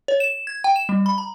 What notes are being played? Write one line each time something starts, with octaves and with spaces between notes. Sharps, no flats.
C#5
E7
G#6
G5
E7
G3
B5
A#5